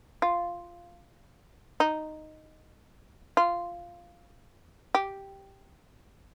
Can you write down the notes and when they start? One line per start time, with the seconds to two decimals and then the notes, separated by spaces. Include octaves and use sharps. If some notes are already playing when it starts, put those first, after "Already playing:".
0.22 F4
1.80 D#4
3.37 F4
4.95 G4